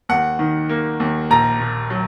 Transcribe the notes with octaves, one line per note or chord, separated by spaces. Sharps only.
D#2 F#5
D#3
A#3
D#2
A#1 A#5
A#2
F#3